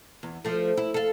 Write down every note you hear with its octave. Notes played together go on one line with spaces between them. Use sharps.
E2
F3 A3
E4
A4 F5